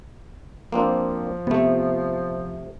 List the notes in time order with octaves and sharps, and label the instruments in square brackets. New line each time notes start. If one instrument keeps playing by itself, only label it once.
[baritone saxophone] F3 [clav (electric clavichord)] A#3 C4 D4
[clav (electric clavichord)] C3 A3 [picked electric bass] B3